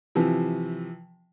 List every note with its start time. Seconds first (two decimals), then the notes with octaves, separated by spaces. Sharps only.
0.15 C3 E3 F3